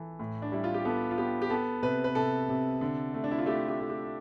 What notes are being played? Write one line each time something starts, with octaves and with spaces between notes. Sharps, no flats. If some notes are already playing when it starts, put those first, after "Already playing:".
Already playing: E3 A4
A2
D4
G3 E4
F4
G4
B3 A4
F4
B3 G4
G4
B3 A4
C3 B4
B4
C3 A4
C3
D3
A3
D4
E4
F4
A3 G4
F4
G4
A3
G4